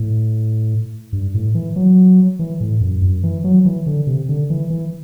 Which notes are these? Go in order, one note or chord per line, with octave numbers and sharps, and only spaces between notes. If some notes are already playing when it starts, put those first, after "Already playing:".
Already playing: A2
G2
A2
E3
F#3
E3
A2
F#2
F#2
E3
F#3
E3
D3
C3
D3
E3
E3